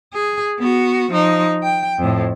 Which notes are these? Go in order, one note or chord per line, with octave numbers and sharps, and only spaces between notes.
G#4
B3 F#4
F3 D#4
G5
F2 A2